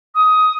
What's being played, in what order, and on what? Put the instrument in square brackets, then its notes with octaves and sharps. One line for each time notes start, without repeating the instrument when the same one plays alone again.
[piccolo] D#6